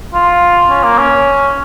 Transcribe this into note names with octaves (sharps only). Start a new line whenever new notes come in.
F4
C#4
A#3
C#4